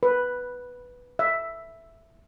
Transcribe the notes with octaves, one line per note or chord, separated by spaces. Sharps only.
B4
E5